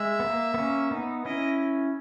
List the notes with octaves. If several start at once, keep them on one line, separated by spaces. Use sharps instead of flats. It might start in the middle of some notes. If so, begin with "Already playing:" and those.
Already playing: G#3 E5
B3
A#3
B3
A#3 C#4
B3 D#4
C#4 E4 D#5